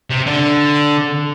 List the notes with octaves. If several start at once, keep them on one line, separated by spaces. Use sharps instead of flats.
C3
D3